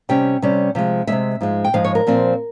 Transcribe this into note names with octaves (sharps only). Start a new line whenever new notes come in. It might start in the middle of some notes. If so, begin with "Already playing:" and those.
C3 G3 C#4 G5
C3 G3 C#4
C3 F3 G#3
C3 F3 G#3 E5
G#2 F3 G#3
G5
G#2 F3 G#3 F5
C#5
A#4
A#2 F3 C4